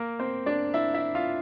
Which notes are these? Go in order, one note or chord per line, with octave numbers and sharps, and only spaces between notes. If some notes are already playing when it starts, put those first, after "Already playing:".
Already playing: A#3 A#4
C4 C5
D4 D5
E4 E5
E4 E5
F4 F5